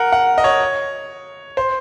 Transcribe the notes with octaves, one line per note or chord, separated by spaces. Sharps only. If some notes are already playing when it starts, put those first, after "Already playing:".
Already playing: A#4 F#5
F#5
D#5
C#5
C5